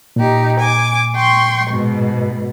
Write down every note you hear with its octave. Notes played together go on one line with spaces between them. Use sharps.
A#2 D#4 G4
G#5 D6
G5 C6 C#6
G#2 B2